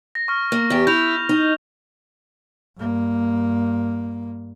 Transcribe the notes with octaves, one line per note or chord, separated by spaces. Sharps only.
A#6
C#6 F6
A#3
E2 G4
E4 G6 F7
D#4
G2 A#3